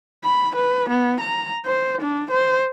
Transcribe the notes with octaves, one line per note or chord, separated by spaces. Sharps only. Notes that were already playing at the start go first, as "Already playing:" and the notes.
B5
B4
B3
A#5
C5
D4
C5